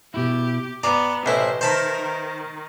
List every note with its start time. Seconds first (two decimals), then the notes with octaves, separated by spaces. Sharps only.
0.14 B2 E4 G4
0.83 B3 D5 G#5 A#5
1.26 A1 E4 B4 C5 D#5 E5
1.61 D#3 A#4 C5 A5 B5
2.01 D#3